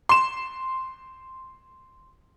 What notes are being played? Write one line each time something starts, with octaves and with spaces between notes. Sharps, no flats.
C6 E7